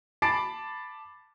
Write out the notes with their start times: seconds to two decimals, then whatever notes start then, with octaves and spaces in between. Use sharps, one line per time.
0.22 A5 B5 D6 A6 C7 D7